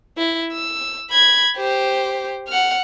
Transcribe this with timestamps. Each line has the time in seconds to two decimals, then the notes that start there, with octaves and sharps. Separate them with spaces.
0.17 E4
0.52 E6
1.11 B5 G#6
1.56 G4 C5
2.48 F#5 F6